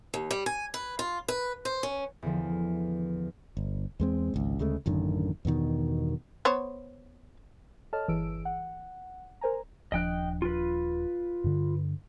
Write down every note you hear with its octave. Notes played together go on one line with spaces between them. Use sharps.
D#2
G3
G#5
B4
F4
B4
C5
C#4
E2 D3 F3
G1
E2 G#3 C4
G#1 C#2
D2 C#3 G#3 A3
A1 F#2 D3 D#3
E2 G2 B2 D#3
B3 C5 C#5
A4 C#5 D#5 A5 F6
G1 E3 G#4 E6 D7
F#5
A#4 C5 G#5 A#5
D#1 F3 D4 D#5 G5 F#6
F4 B4
G2 D3